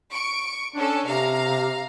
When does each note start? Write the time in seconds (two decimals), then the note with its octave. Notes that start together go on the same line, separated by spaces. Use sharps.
0.12 C#6 D7
0.75 C#4 D4 A4
1.06 C3 F5 A#5